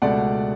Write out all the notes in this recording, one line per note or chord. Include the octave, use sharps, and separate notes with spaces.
C#2 B2 A3 D5 F#5